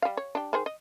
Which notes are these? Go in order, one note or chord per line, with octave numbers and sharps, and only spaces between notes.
G3 F5
C#5
D4 G4
D#3 G#4 C5
D#5